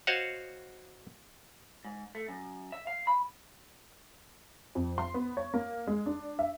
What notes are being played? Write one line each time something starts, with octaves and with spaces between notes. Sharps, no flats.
F#4 C5 C#5 D#5 F5 F#5
G#2
A3
F#2
E5
F5
B5
F2
C6
B3
C#5
A#3
G#3
D4
E5